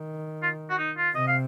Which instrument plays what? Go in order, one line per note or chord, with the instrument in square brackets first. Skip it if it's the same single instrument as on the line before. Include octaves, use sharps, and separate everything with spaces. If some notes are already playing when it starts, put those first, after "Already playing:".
Already playing: [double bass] D#3
[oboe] F4
F#4
D#4
F4
[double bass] C3 [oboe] D#5
[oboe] F5